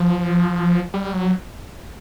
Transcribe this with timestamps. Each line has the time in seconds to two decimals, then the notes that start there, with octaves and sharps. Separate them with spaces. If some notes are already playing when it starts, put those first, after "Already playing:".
Already playing: F3
0.94 G3
1.13 F#3